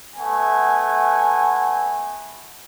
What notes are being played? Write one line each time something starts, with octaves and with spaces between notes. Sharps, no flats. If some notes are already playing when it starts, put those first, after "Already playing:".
A3 B3 F#5 G#5